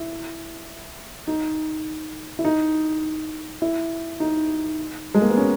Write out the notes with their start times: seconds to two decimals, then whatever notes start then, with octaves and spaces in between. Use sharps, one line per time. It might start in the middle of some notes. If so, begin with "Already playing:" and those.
Already playing: E4
1.27 D#4
2.39 E4
2.45 D#4
3.62 E4
4.20 D#4
5.15 G#3
5.22 A#3
5.30 B3
5.37 C#4